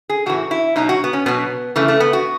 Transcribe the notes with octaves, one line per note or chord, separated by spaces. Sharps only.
G#4
A2 E3 F#4
E4
B2 F#3 D#4
F#4
B3
C#4
B2 F#3 B3
C#3 E3 A3
A3
B3
F#4